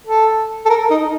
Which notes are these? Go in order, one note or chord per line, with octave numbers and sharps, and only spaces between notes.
A4
A4
A#4
D#4